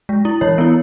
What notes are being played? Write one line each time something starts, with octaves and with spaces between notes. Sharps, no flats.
G#3
E4
E3 C#5
B3 E4